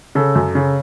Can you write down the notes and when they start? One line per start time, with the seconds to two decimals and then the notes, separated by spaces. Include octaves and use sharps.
0.15 C#3 A4
0.35 F#2
0.55 C#3